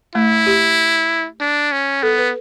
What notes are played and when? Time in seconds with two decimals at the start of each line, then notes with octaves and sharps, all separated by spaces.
0.15 A3 E4
0.46 G4
1.40 D4
1.72 C#4
2.03 B3 A4
2.18 B4